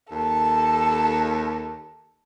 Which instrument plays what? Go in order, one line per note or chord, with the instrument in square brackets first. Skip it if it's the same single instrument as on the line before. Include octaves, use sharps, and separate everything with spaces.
[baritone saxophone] D#2 [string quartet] A4